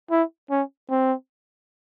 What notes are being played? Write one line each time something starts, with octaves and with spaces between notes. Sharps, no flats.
E4
C#4
C4